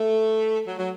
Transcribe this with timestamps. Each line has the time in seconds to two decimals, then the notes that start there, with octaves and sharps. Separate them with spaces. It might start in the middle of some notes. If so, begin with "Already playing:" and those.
Already playing: A3
0.67 F#3
0.78 F#3